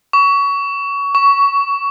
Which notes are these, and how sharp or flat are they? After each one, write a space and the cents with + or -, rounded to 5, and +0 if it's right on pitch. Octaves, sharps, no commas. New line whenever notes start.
C#6 +25
C#6 +15